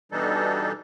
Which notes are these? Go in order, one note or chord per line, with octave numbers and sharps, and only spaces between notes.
B2 E3 G3 D4 D#4 A4